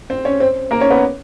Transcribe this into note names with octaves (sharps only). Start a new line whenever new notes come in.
C4 C5
C#4 C#5
C4 C5
A#3 A#4
C#4 C#5
B3 B4